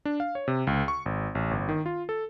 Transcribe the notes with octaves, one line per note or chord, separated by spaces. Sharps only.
D4
F5
C#5
C3
C#2
C#6
G#1
A1
G1
D#3
F4
A4